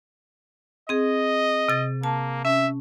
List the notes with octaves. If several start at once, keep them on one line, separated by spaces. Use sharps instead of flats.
C4 G#4 D#5
C3 A6
A#3 A5
C#4 E5